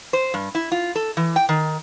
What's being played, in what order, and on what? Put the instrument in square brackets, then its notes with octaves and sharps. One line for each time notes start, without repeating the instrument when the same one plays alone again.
[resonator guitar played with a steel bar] C5
G2
E4
F4
A4
E3
G5
D#3